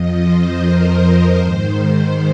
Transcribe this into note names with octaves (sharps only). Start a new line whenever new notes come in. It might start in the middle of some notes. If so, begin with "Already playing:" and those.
Already playing: F2 F3 D#5
C5
A#4
G#2 D#3 C5
C5